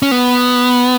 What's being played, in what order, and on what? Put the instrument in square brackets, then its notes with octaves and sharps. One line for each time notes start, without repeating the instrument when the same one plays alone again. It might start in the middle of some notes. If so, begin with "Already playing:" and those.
[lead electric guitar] C#4
B3